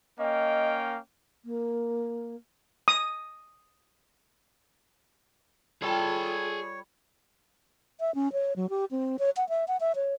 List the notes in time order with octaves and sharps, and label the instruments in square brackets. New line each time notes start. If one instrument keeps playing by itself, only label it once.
[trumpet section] A#3 C#4 G5 [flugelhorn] D#5
[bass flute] A#3
[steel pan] D#6
[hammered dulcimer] G3 [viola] F4 A4 [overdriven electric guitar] G#4 A5 [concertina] C#5
[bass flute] E5
C#4
C#5
F#3
G4
C4
C#5
F#5
E5
F#5
E5
C#5